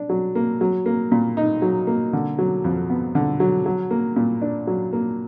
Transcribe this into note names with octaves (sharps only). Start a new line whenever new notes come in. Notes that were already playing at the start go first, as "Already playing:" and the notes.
Already playing: D4
F#3
A#3
F#3
A#3
A#2
D#4
F#3
A#3
D3
F#3
F2
B3
D3
F#3
F#3
A#3
A#2
D4
F#3
A#3